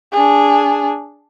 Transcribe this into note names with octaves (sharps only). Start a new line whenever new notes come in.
D4 G#4